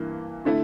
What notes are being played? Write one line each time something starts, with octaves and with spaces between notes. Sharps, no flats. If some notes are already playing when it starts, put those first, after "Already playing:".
Already playing: G2 E3 A#3
D3 A3 E4